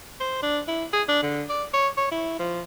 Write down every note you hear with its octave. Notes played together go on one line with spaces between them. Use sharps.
C5
D4
E4
G#4
D4
D3
D5
C#5
C#5
E4
F3